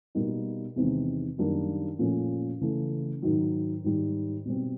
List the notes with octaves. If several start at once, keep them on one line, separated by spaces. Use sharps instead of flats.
B2 G3 A#3 D#4
E2 C3 D#3 G#3
F#2 D#3 G3 A#3 D4
A#2 F3 A3 C#4
C#3 E3 A3
G#2 D#3 F#3
G#2 D#3 G3
B2 G3 C4